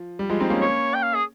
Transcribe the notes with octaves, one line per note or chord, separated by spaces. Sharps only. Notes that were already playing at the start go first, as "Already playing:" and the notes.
Already playing: F3
G3
F3 G#3
C4 D#4
A#3 C#4
C#5
G5
F5
G#4